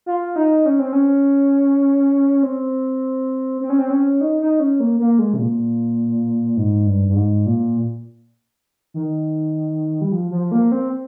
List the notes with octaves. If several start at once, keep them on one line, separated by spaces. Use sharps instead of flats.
F4
D#4
C#4
C4
C#4
C4
C4
C#4
C4
C#4
D#4
D#4
C#4
A#3
A#3
G#3
C3
A#2
G#2
G2
G2
G#2
A#2
D#3
G3
F3
F3
A#3
C4